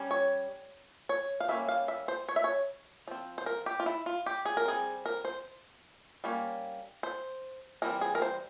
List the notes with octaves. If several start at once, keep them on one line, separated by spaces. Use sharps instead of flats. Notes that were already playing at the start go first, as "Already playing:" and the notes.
Already playing: G3 C#4
C#5
C#5
F5
G3 A#3 C#4 E5
F5
E5
C5
C#5
E5
C#5
F3 C4
C5
A#4
G4
F4
E4
F4
G4
G#4
A#4
G3 C4 G#4
A#4
C5
G3 A#3 C#4
C5
E3 G3 C4 A#4
G#4
A#4
C5